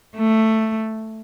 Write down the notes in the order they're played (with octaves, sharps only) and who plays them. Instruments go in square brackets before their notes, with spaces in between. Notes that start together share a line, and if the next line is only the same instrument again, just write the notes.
[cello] A3